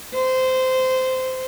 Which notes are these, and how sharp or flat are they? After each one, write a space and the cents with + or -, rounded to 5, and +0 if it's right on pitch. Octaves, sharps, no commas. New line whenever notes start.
C5 -15